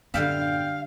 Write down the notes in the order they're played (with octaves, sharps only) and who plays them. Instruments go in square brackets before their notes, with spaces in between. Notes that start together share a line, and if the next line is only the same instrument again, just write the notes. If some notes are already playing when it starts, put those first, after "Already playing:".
[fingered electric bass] F#2 A2 B3 [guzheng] D3 G3 E5 [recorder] F5 [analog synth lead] G5